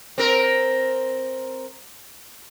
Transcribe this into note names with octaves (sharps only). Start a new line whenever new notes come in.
C4 A#4